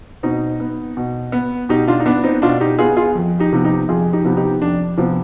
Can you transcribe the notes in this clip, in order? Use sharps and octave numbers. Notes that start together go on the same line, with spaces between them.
B2 C4 D#4
B3
B2
B3
B2 D#4 G4
D4 F4
D#4
B3 D4
C4 D#4
B2 D4 F4
D#4 G4
B3 F4 G#4
F4 G#4
F2
D#4 G4
C3 F3 B3
D#4 G4
F2 F4 G#4
D#4 G4
C3 F3 B3
D#4 G4
F2 D4
C3 F3 B3